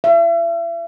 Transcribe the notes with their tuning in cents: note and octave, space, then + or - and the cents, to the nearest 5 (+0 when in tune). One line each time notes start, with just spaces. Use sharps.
E5 +40